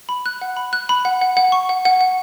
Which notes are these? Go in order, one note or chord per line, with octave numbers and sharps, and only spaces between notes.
B5
F#6
F#5
B5
F#6
B5
F#5
F#5
F#5
C#6
F#5
F#5
F#5